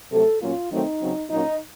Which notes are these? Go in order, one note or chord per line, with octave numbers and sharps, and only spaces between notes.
C3 F#3 A3 A4
A#2 F#3 A#3 C#4 F4
D#3 F#3 A3 C4 D#4
C#3 F#3 C4
A#2 F#3 A#3 C#4 D#4